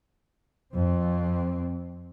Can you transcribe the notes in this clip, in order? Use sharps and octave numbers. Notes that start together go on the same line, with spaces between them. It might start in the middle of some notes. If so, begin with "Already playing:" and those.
F2 C4